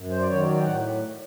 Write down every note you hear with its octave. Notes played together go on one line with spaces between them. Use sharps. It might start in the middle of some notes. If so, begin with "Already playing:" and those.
Already playing: F#2
C5
D5
D#3 F#3 C#5
D5
G5
A2 F#5